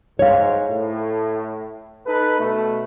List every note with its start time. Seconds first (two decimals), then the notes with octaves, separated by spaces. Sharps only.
0.19 G#2 C#5 F5
0.69 A2
2.07 D#4 A4 B4
2.39 B2 A3